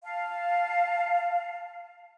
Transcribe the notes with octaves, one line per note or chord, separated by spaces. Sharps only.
F5 A5